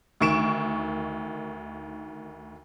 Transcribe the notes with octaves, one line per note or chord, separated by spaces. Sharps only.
D2 D#3 C#6 D7 E7